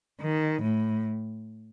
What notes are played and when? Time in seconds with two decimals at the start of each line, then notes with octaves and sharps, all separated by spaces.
0.22 D#3
0.62 A2